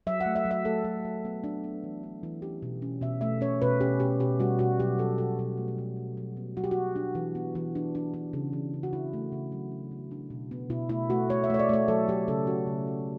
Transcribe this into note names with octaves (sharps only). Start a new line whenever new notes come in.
F#3 E5
F#5
A3
E5
F#3
E5
A3 A4
F#3
A3
B3
D4
B3
E3
D4
E3
C#4 G4
B2
C#4
B2 E5
A3 E5
C#4 C#5
B2 B4
C#4 G4
B2 G4
B2 G4
G3 F#4
B2 F#4
F#3 G4
F#3 A4
B2 A4
B2 A4
A3
G4
B2
F#3
F#3
B3
F#3 F#4
G4
F#3 F#4
D4
E3
B3
E3
D4
D4
D4
C#3
E3
C#3
F#4
E3 E4
A3
C#3
F#3
D4
B3
D4
B2
B3
B2 E4
A3 E4
A3 F#4
A3 C#5
E5
A3 C#5
D5
A3 C#5
F#3 A4
F#3 G4
C#3 A4
C#4 F#4
C#3
F#3